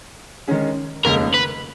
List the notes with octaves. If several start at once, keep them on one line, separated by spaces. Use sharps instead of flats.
D#3 G#3 C#4 G#4
F1 D#2 C#3 G#3 A#4
B4